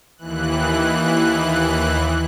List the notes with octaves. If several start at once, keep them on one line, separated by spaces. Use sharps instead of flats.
D#2 E3 F#6